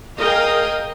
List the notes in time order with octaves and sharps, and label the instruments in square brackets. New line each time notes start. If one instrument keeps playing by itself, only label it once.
[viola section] G#4 A#4 D#5 F5 G5